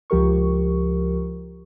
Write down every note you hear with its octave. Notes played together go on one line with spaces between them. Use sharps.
C#2 F3 G4 A#4 C#6